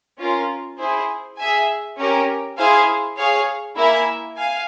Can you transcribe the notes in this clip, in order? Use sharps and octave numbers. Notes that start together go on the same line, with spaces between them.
C#4 F4 A#4
E4 G#4 C5
G#4 E5 G#5
C#4 G4 A#4
E4 G#4 C5 F5 G#5
G#4 C#5 F5
A#3 E4 A#4 E5 G#5
F5 G#5